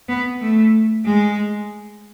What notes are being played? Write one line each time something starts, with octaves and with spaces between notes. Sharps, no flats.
B3
A3
G#3